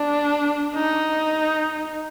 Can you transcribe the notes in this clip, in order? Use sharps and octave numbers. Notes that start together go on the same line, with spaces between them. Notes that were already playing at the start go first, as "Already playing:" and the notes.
Already playing: D4
D#4